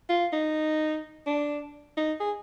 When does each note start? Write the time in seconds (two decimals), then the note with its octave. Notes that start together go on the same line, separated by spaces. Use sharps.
0.09 F4
0.33 D#4
1.26 D4
1.97 D#4
2.20 G#4